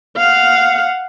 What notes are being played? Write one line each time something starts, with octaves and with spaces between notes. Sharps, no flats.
F5 F#5